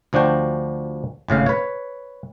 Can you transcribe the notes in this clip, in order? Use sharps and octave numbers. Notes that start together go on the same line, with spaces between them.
D2 F3 D4 F#4 G5
G#1 A2 C#3 F5
B4 C#5